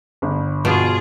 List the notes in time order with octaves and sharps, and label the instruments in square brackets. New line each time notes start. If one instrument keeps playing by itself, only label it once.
[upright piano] G1
[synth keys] G2 [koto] B2 [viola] F4 G#4